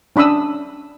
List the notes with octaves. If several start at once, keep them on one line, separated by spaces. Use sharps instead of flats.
C#4 D4 B5 D#6 E6